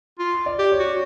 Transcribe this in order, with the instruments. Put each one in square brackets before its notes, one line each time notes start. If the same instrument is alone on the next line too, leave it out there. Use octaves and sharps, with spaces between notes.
[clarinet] F4
[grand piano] D5
[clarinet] G4
[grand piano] C#5
[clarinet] F#4